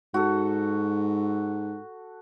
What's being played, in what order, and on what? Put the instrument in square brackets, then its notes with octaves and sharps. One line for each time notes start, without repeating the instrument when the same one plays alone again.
[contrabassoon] G#2 [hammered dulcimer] F#4 A4